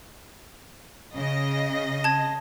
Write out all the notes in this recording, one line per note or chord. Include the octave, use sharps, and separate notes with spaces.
C#3 D#5 A#6
A5 G#6